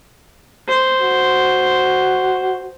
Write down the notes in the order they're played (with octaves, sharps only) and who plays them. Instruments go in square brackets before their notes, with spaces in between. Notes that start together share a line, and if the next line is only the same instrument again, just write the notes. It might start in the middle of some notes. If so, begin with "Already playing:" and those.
[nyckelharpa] C5
[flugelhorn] F#4